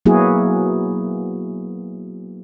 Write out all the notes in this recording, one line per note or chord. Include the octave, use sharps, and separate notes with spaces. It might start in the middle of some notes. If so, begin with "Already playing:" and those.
F#3 A#3 B3 E4 F#4 G#4